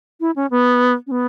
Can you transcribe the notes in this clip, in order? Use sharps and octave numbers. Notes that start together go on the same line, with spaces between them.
E4
C#4
B3
C#4
B3